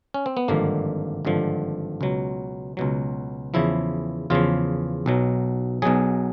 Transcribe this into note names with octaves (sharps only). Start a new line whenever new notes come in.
C#4
C4
B3
G#1 G2 D3 F3 A#3
G#1 G2 D3 F3
C#2 B2 F#3
C#2 B2 F#3
E2 C#3 F3 E4
E2 C#3 F3 F4
B1 B2 F#3
B1 B2 F#3 G#4